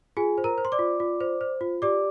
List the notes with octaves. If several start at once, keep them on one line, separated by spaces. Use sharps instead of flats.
F4 G#4 G#5
C5
A#4 A#5
C5
C6
D5 D6
F4
F4
C5
C5
F4
G4 D5 D6